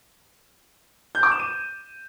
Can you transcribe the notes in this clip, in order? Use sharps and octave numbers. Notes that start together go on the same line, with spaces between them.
G6
D6
E7
D#7